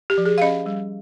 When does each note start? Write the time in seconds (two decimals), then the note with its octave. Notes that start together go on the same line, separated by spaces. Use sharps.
0.10 G4
0.18 F3
0.25 G#4
0.38 F5
0.42 C#4 D#5
0.66 G3